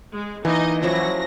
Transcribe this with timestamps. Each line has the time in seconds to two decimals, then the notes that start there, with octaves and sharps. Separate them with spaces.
0.14 G#3
0.45 E3 A#3 D#4 D#5
0.83 F3 F#3 C#4 E4 A#6